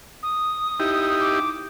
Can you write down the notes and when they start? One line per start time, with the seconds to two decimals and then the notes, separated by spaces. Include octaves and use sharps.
0.23 D#6
0.80 D#4 E4 G4
1.20 D6